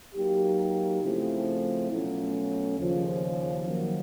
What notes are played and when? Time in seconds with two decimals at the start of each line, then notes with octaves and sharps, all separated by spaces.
0.14 F#3 A#3 D#4 G4
1.01 C#3 F3 A3 C4 E4
1.89 B2 F#3 A3 C#4 F4
2.77 D#2 C#3 F3
3.65 D#3 F#3 A#3